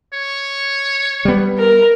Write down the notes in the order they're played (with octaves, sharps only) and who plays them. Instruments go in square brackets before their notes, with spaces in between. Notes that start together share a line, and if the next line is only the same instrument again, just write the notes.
[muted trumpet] C#5
[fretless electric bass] G3 B3
[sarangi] A#4